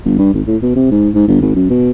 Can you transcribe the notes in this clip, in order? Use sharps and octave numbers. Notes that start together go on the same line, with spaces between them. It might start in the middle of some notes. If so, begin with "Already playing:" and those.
G1
G2
G#1
A2
B2
C3
G#2
G#2
G1
G#1
F#2
B2